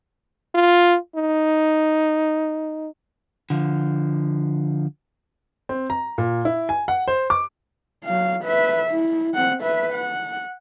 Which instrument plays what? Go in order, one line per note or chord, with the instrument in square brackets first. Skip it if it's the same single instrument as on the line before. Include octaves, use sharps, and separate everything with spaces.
[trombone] F4
D#4
[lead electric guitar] D3 F3
[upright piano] C4
A#5
A#2
E4
G#5
F#5
C5
D6
[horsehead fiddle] F#3 F5
B4 E5
E4
C4 F#5
B4 E5
F#5